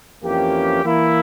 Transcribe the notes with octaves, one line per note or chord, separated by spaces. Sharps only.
F2 E3 A#3 C#4 G4
E3 A#3 E4